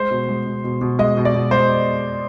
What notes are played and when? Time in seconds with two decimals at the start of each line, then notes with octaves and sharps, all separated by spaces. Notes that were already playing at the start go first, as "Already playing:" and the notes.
Already playing: G#3 C5
0.11 B2
0.29 G#3
0.46 B2
0.64 B2
0.81 B2
0.99 G#3 D#5
1.17 B2
1.25 D5
1.34 B2
1.51 G#3 C5